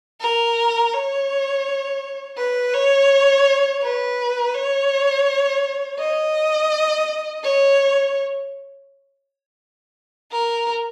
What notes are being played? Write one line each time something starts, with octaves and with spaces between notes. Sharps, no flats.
A#4
C#5
B4
C#5
B4
C#5
D#5
C#5
A#4